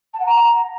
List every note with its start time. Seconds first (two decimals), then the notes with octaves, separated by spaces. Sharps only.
0.13 A5
0.19 F#5
0.25 A#5